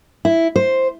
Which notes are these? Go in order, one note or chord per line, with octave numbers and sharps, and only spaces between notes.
E4
C5